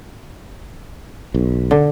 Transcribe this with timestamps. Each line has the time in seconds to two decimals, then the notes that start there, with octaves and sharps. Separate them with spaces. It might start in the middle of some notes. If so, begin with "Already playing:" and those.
1.34 B1
1.71 D3